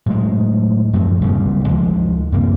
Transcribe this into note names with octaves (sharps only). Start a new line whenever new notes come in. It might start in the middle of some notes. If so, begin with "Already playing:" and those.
A2 F#3 G#3
F#2 A2 F3 F#3
D1 C2 A#2 C#3
D2 F3 G#3
F#2 C3 A#3